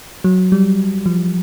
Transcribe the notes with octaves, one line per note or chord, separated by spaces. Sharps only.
F#3
G3
F3